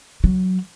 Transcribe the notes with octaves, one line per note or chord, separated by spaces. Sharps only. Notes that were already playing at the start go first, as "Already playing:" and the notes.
F#3